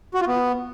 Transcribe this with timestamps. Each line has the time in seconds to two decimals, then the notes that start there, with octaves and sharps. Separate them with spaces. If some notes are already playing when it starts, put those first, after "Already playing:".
0.14 F#4
0.21 F4
0.27 B3